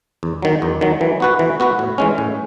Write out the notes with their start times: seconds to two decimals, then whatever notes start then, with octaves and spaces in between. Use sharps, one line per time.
0.23 E2
0.42 D#3 F#3
0.62 E2
0.81 D#3 F#3
1.01 E3
1.20 B3 F#4 B4
1.39 E3
1.60 B3 F#4 B4
1.79 A2
1.98 E3 G#3 C#4
2.18 A2